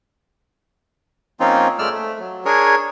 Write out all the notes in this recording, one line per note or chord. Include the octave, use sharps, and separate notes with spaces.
F3 A#3 C4 C#4 D#4 F4
A#2 G#3 A3 D5 E6 F6
A3
F#3
D4 G#4 A#4 C#5